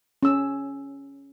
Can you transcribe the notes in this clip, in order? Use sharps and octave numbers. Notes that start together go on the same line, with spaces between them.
C#4 E6